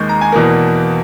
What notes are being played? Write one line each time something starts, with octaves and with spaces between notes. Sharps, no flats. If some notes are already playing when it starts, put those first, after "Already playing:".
Already playing: D#2 D#3 G#3 C#6 G6
A#5
G#5
E2 B2 A#3